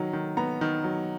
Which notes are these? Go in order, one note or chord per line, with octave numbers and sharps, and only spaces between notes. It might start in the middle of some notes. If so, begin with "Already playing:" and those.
Already playing: D#3 F#3
D#3
B3 A#5
D#3
F#3